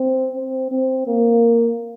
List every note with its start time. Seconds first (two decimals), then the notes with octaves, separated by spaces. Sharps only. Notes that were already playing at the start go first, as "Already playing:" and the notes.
Already playing: C4
0.37 C4
0.71 C4
1.07 A#3